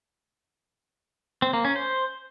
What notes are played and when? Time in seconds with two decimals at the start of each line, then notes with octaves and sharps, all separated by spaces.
1.42 C4
1.53 A#3
1.65 C#4
1.76 C5